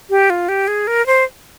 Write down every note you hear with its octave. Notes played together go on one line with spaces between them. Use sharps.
G4
F4
G4
G#4
A#4
C5